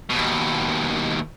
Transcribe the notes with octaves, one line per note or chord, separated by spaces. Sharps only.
D#2 B2